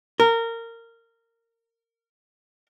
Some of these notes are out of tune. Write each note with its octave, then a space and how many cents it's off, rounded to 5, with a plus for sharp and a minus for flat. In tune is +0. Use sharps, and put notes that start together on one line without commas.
A#4 -20